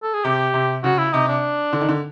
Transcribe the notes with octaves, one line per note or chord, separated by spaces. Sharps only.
A4
G#4
C3 G4
C3
C#3 F#4
E4
C3 D#4
D4
D3
D#3
D3